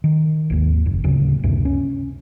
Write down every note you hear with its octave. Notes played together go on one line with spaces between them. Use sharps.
D#3
G#1 D#2
F#1
D1 C#3
C#2 F#2 C3
C#4